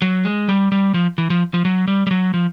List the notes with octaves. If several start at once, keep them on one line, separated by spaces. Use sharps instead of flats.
F#3
G#3
G3
G3
F3
E3
F3
F3
F#3
G3
G3
F#3
F3